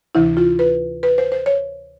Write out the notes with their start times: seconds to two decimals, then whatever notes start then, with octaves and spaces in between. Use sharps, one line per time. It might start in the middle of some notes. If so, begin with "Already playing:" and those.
0.15 D2 C3 E3 E4
0.37 F4
0.59 B4
1.03 B4
1.18 C5
1.32 C5
1.46 C#5